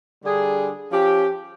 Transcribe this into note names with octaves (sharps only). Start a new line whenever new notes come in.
D3 G3 D4 G#4
F3 C#4 G4